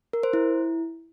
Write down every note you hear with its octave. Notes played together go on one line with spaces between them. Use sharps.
A#4
C5
E4